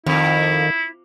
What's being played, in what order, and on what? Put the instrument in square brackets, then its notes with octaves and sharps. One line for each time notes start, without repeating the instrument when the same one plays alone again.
[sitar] F2 [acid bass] D#3 [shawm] E4